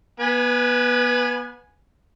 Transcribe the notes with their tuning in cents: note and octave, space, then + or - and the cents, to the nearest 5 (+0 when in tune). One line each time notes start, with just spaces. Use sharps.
B3 -30 B4 +0 G#5 +0